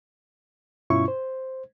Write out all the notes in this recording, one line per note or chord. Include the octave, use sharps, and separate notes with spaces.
G2 B2 C#4 E4 F4 C#6
C5